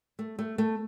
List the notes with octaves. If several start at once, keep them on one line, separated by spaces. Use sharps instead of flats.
A3
A3
A3